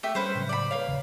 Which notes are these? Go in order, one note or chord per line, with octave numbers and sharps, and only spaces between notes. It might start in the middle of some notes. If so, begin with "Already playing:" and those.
A3 G4 E5
G3 C#4 B4 C5
A2 C#3 F#3
D5 B5
A#3 B4 C#5 F5
G#1 E2 C#3